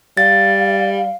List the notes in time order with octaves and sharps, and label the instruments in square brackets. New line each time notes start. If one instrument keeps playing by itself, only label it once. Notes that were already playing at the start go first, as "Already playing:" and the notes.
[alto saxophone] G3 [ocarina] F5 [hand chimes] A6